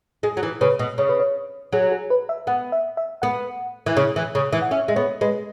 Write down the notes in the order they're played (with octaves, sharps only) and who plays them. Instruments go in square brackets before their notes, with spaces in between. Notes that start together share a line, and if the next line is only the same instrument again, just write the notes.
[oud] G#3 [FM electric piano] G#4
[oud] F#3
E3
[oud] C#3 [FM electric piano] B4
[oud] B2
[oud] C#3 [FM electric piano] C#5
[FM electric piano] B4
C#5
[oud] F#3 [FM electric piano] G#4
[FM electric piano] G#4
B4
E5
[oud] B3 [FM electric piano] F#5
[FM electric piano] E5
E5
[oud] B3 [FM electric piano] F#5
[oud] E3
C#3
E3
C#3
E3
[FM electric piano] F#5
[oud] C#4 [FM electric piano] E5
[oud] G#3 [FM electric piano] E5
[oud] B3 [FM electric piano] C#5
[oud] G#3 [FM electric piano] B4